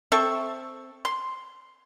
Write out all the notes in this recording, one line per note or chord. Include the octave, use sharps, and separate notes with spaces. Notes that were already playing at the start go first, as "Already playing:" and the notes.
C4 A4 E5 C#6
C6